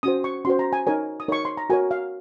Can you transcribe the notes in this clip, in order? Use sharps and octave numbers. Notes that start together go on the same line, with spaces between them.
C#4 F#4 C5 D#6
C#6
C#4 F#4 C5 C6
A#5
G#5
D#4 A#4 C#5 G#5
D#6
D#4 A#4 C#5 C#6
C6
A#5
F#4 A#4 C#5 G#5
F5